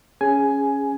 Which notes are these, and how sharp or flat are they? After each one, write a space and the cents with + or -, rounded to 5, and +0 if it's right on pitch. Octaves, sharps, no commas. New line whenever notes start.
C#4 +0 G#4 +0 G#5 +10